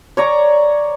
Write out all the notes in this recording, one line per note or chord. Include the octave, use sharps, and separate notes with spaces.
C#5 D5 A#5